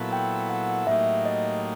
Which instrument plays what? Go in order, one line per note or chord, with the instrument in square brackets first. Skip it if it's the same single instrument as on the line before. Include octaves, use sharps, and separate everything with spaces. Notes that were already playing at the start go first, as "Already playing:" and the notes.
Already playing: [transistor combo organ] A#2 F#3 B3 E4 A4
[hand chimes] G5
F#5
[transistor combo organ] A2 F#3 A#3 D#4 G4 [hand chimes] E5
[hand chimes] D#5